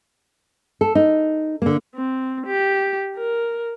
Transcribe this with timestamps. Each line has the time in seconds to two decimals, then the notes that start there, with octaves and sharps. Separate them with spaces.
0.81 A4
0.95 D#4
1.62 D3 A#3
1.95 C4
2.47 G4
3.17 A#4